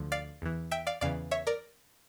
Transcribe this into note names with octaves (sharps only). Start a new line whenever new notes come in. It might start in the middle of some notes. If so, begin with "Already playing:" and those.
Already playing: D2 D3 F3
D5 F5
E2 E3
E5 G5
D5 F5
E2 C#3 E3 D5 F5
C#5 E5
A#4 D5